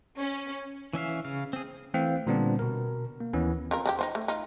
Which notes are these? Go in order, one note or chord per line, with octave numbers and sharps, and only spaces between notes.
C#4
E3 C#4 E5 F5
C#3 F5
C4 G#4
E3 A3 C4 F5 G5
A#2 D3 G3 B3 C4 D4
B2 A#4
A#3
D#2 E3 B3 C#4
C4 F4 A#4
C#3 D4 G4
D#4 F4 C5
A3
D#4 F4